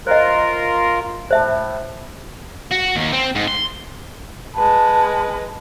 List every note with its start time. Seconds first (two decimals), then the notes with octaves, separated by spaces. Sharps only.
0.07 F4 A#4 C5 D#5
1.31 A2 C5 E5 A5
2.71 F#4
2.96 D#2
3.12 C4
3.35 G#2
3.48 C6
4.55 G#3 B4 A5